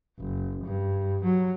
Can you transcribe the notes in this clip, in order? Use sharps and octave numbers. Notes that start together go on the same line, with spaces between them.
F#1
G2
F#3